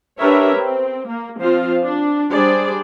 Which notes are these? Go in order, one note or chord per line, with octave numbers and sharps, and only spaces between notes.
D4 G4 A#4 B4 C#5 E5
C4
A#3
F3 C4 F4 C5 F5
D4
G3 D4 G#4 C5 D5